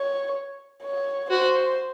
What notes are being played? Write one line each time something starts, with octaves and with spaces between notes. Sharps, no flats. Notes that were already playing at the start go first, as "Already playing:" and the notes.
Already playing: C#5
C#5
F#4 C5